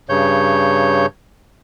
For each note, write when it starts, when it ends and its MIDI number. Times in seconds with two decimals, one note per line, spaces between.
0.09 1.06 43
0.09 1.06 49
0.09 1.06 73
0.09 1.06 91